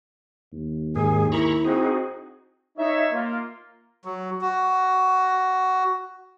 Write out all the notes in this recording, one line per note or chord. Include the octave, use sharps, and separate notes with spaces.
D#2
G#2 D#3 G#4 G#5
E4 A#4 A#5 B5 C#6
C4 D#4 F#4 G#4
D#4 C#5 E5
A#3 F4
F#3
F#4